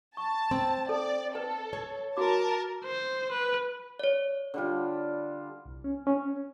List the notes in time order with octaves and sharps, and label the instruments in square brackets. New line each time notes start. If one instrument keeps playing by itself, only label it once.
[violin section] A5 [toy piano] C#6
[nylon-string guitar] C4 [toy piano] C6
[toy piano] A4 [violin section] D5
[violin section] A4 [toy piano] B4
[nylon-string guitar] C#5
[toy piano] F#4 D6 [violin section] A#4 A5
[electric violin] C5
B4
[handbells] C#5 D5
[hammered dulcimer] D3 G3 F4
[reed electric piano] C2
C#4
C#4